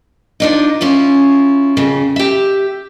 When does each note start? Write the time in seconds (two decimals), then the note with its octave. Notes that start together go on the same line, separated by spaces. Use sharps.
0.40 F3 D4 D#4
0.81 C#4 E4 F4
1.77 F2 C#3
2.16 G4 E5